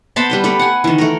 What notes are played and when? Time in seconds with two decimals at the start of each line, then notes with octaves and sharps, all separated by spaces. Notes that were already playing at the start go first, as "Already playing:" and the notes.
0.16 B3 C5 A5 B5
0.30 G3 B4 G5
0.44 A3 G4 B4
0.59 F#5 G#5
0.84 D#3 E3
0.98 A3 A#4